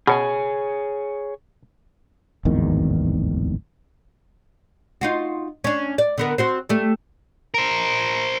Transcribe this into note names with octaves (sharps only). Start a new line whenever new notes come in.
B2 G#4 C#5 G#5
D1 G#1 E2 D#3
D#4 F4 F#4
C#4 D4
D5
D3 B3 A#4
C4 F#4 C5
G3 A3
A#4 C5